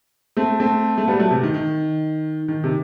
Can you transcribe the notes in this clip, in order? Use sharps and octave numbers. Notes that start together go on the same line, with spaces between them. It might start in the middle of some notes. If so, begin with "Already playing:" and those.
A3 C4
A3 C4
A3
G3 B3
F#3 A3
C3
D#3
D#3
D#3
C3